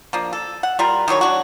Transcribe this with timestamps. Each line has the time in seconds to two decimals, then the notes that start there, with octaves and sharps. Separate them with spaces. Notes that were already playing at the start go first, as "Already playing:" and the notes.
0.13 F3 A#3 D4
0.33 A4
0.63 F#5
0.79 G3 F4 A#4
1.08 D#3 E3 F#3 C#5
1.21 F#3 D4 F#4